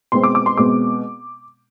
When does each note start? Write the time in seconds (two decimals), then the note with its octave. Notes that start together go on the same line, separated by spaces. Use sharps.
0.12 B2 G#3 C4 C6
0.23 D6
0.35 D6
0.46 C6
0.57 B2 G#3 C4 D6